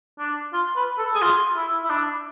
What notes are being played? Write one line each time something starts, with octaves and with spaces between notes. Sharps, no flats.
D4
F4
B4
A4
G#4
F4
E4
E4
D4